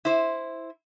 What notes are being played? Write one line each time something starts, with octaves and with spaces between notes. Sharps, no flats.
E4 C5